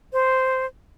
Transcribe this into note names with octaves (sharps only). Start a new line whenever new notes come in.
C5